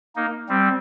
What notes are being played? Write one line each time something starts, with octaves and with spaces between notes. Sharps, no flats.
A#3 D#4
G3 C4